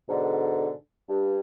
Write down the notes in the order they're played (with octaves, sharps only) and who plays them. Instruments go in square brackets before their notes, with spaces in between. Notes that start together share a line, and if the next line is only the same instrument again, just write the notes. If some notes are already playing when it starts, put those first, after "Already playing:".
[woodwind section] G#2 B2 D3
G2